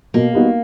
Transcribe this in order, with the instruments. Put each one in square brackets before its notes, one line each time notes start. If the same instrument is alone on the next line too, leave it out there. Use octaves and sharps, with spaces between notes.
[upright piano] B2 [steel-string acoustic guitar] A#3
[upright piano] G3 B3 D#4 F#4